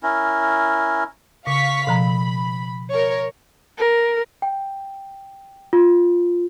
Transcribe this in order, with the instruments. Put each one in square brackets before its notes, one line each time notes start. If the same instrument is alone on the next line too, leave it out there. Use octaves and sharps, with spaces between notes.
[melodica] C#4 E4 A#4
[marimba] C#3 [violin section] F5 C#6 B6
[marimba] B2 F3 A#5 [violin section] B5
[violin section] A#4 C#5
[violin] A#4
[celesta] G5
F4